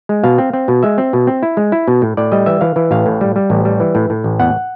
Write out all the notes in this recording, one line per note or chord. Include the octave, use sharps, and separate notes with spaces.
G#3
B2 F5
C4
C4
B2
G#3 E5
C4
B2
C4
E4
G#3
E4
B2
A2
A2 D5
G3 D#5
E3 E5
E3 F5
E3
A1 F5
A2
G3
G3
A1
G3
E3
A2
A2
A1
E2 F#5